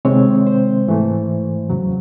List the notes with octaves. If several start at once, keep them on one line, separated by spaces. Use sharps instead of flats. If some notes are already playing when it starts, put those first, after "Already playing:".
C3 D#3 G#3 C4 C#5
C5
G#2 E3 A3
E2 C#3 F#3